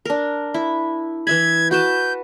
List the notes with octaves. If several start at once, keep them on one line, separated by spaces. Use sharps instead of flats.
D4 A#4
E4
E3 E5 B5 G#6
F#4 B4 A5 G6